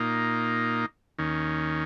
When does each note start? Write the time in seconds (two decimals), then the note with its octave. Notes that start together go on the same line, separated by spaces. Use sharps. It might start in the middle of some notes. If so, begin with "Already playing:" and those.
Already playing: A#2 A#3 D#4
1.18 D#2 D#3 C#4